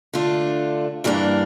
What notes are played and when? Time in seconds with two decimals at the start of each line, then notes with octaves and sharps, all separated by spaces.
0.13 D3 A3 D4 F4
1.04 G2 E3 G3 A#3 D4